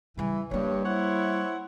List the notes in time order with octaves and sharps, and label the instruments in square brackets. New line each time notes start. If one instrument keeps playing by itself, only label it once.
[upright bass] C#3 G3 [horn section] E3
[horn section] G2 [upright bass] G3 A#3 [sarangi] C#5
[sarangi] E4 [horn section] C5 C#5 F#5